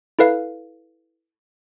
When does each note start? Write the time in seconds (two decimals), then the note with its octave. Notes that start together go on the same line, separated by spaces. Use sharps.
0.19 E4 A4 B4 F5